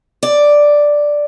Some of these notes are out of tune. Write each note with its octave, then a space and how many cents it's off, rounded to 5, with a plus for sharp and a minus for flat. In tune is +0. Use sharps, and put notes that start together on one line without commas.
D5 +0